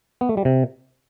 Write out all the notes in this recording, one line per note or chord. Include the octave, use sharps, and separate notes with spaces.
B3
A3
G3
C3